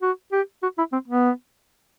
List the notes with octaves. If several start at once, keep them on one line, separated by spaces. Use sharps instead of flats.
F#4
G4
F#4
E4
C4
B3